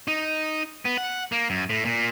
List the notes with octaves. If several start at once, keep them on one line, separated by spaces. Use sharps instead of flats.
D#4
B3
F#5
A#3
F#2
A2
A#2